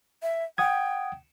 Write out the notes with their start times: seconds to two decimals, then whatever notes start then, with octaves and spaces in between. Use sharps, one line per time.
0.23 E5
0.58 F#5 G5 D#6 G#6